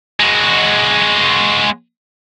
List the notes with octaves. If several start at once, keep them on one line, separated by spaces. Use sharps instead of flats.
G#3 F#4